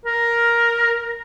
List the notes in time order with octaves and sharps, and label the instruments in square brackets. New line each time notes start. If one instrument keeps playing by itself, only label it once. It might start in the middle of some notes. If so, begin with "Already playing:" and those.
[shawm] A#4